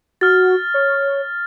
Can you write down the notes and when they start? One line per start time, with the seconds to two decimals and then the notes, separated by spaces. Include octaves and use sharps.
0.21 F#4 F6 A6
0.74 C#5